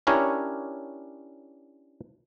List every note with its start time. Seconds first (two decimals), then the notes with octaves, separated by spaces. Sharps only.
0.07 C#4 D4 E4 G4 A#4 C#5